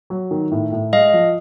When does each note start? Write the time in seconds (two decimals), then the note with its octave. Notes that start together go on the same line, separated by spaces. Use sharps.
0.10 F#3
0.31 D#3
0.52 A2
0.72 A2
0.93 G#3 D#5 F5
1.13 F3